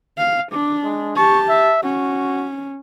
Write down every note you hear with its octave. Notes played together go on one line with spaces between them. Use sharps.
F5
D4 D6
G#3
G4 A5 C#6
E5
C#4 F#4